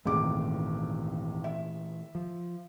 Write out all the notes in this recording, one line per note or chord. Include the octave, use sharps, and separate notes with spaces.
G#1 C#2 A#2 E3 A3 D6
E5
F3